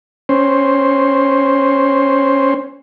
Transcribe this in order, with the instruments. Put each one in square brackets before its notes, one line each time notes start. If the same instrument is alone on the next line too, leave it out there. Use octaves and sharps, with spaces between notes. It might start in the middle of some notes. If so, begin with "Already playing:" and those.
[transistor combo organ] C#4 C5